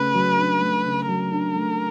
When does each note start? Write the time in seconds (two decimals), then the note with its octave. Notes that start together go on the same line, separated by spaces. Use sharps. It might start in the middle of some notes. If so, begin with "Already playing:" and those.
Already playing: C#3 A3 B4
0.15 F#3
0.39 D4
0.62 A3
0.85 C#3
1.08 F#3 A#4
1.32 D4
1.55 A3